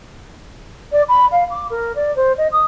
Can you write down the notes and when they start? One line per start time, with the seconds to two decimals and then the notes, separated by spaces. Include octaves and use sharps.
0.92 D5
1.09 B5
1.31 F5
1.50 D6
1.70 A#4
1.95 D5
2.16 C5
2.37 D#5
2.52 D#6